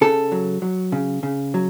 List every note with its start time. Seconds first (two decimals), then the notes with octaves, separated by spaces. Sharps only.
0.01 C#3 A4
0.32 F#3
0.62 F#3
0.92 C#3
1.23 C#3
1.54 F#3